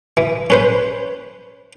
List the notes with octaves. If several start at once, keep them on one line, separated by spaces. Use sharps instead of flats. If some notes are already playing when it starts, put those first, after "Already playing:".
E3
C#4 B4 C5